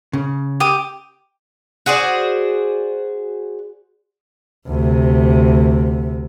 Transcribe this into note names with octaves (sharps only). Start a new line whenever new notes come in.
C#3
G4 D#6
F#4 G#4 C5 D5
D2 C3